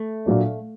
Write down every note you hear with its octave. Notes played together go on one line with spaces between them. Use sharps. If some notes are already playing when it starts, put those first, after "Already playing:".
Already playing: A3
A#2 F#3 A#3 D4